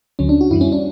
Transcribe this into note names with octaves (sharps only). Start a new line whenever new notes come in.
D2 D3 F#3 C#4
D4
F#4
F#2 E3 G3 E4
C#4
D4